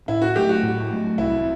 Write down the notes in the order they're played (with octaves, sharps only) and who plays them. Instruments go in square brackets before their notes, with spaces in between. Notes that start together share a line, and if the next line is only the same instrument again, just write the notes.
[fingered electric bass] A2 [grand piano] E4
[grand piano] F#4
[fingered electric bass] F#3 A3 [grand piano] G4
[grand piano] F#4
[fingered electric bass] A2
F#3 A3
[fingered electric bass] C2 [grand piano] E4